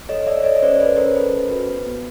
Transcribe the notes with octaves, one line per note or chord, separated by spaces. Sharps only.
A4 C#5 D#5
A4 D5 E5
A4 C#5 D#5
C#4 C5 D5
A4 B4 C#5
C#4 A#4 C5
A4 B4
C#4
F#4
B3
B3